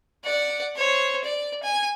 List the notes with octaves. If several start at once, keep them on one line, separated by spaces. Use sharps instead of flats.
D5 F#5
C5 C#5
D5
G#5